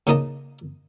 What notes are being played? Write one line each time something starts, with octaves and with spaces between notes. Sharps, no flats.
C#3 A#3 D#4 D#5 A5